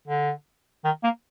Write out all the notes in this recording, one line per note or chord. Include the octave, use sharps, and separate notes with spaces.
D3
D#3
A#3